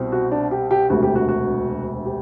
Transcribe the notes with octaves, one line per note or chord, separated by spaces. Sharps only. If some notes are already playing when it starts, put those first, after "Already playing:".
Already playing: C2 B2 G3 C4
F#4
D4
G4
G4
E1 D2 C3 F#4
G4
F#4
F#4
G4